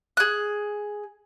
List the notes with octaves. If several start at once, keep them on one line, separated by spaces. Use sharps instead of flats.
G#4 F#6